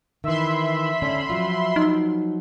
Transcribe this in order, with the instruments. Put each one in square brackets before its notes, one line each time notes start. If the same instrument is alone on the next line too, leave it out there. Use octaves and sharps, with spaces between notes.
[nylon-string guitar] D#3 E3 [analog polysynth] E5 B5 C6
[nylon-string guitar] D3 C#4 D4
F3 F#3 F4
[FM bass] D#4